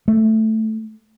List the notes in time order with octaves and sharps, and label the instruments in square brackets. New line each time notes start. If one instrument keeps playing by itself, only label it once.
[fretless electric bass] A3